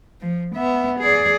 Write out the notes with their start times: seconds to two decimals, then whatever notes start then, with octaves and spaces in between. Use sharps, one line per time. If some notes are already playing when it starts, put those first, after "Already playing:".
0.21 F3
0.55 B3 E5
0.99 G#4 D5